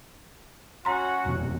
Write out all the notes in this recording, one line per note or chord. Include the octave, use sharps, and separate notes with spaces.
C#4 F#4 A#5 C6
D#1 F2 B2